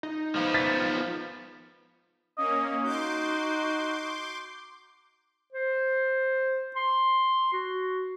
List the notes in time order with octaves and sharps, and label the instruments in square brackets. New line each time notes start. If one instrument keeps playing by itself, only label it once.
[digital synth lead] D#4
[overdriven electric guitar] F3 B3
[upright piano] A6 B6
[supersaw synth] A#3 C#4 [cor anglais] D#5
[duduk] D#4 [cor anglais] F#4 [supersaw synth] C6 D6 G6
[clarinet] C5
C6
F#4